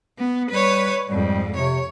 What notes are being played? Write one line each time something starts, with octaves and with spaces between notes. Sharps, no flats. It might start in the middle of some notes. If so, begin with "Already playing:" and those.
B3
G3 B4 C#5
F2 G#2 G3
C3 C#5